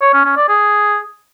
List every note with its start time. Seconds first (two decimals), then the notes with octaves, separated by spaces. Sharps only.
0.02 C#5
0.14 C#4
0.25 C#4
0.37 D5
0.48 G#4